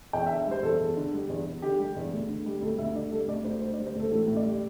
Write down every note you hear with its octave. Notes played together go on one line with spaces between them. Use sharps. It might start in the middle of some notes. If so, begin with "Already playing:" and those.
E2 G5
E5
D3
E5
G3 C5
E2 A4
E2
D3
G3
E2
E2
D3 G4
G3
E2
D2
D3
G3
D2 A4
D2 E5
D3 D5
G3 A4
D2 D5
D2 C5
D3 C5
D5
G3
C5
D2 A4
A1 A4
A2
D5
G3